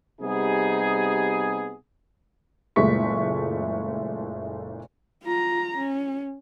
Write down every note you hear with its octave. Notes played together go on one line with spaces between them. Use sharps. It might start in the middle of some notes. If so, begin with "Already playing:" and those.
C3 G3 B3 D#4 G#4
F#1 A#2 G#3 A3 C#6 B6
F4 A#5
C#4